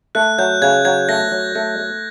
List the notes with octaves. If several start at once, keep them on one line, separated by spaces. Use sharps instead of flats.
A3 F#6
F#3 G6
C#3 G#6
F#3 G#6
A3 A#6
F#3
A3
A3